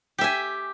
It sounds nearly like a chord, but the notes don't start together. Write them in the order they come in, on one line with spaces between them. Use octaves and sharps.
G4 E5 G#5